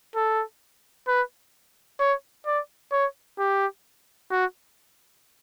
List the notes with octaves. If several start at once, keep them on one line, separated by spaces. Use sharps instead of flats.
A4
B4
C#5
D5
C#5
G4
F#4